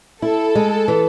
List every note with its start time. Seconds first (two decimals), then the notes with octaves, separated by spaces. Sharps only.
0.22 E4 A4
0.55 G#3
0.88 E3